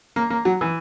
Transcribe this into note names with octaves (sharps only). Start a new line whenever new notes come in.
A#3
A#3
F#3
E3